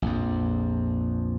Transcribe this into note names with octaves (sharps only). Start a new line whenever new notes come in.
A#1 F2